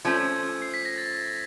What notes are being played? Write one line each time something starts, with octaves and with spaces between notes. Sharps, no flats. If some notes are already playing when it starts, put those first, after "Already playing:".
F3 A3 C#4 G#6
C7
B6
A#6
A6